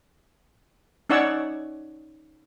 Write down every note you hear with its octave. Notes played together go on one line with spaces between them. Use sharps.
C#4 D#4 C#5 D5 F#5 E6